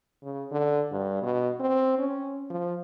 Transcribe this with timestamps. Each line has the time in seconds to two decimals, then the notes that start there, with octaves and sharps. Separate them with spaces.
0.23 C#3
0.52 D3
0.92 G2
1.22 B2
1.60 C4
1.99 C#4
2.50 F3